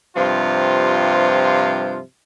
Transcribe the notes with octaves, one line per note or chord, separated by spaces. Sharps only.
G2 C3 F3 F4